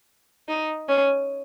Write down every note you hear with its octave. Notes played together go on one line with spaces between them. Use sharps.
D#4
C#4